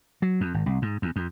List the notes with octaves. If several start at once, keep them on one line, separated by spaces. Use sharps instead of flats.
F#3
F2
G#1
C2
G#2
E2
F2